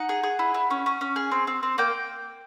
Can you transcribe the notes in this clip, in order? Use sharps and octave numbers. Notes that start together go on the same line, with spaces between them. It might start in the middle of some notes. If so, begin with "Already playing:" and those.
Already playing: D#4 F#5
G#4
G#4
E4
E4
C#4
C#4
C#4
G#4
C4
C4
C4
A#3 G5